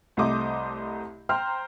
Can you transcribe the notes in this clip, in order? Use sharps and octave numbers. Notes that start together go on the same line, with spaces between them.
C2 A3 C5 D#5 D6
C5 G5 A#5 F6